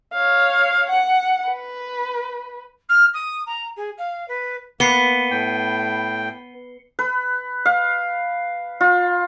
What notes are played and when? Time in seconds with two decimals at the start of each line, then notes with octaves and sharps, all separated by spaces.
0.14 C#5 F5
0.90 F#5
1.47 B4
2.89 F6
3.13 D#6
3.46 A#5
3.76 G#4
3.97 F5
4.28 B4
4.80 A#3 B3 C7 C#7 G7
5.31 A2 G5
6.99 B4
7.66 F5
8.81 F4